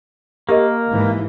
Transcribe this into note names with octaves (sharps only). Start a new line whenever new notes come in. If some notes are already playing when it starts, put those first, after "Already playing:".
A#3 G4 A#4 D#5
G#2 E3